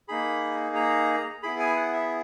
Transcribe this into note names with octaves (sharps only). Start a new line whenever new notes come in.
A#3 D#4 G#4 B5
A#5
B3 E4 G#4 B5
G#5
F#5
E5